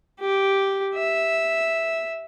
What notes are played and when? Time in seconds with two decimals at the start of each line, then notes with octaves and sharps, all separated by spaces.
0.20 G4
0.95 E5